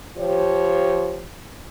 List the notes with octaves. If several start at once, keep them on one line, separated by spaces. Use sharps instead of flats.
F3 G4 C#5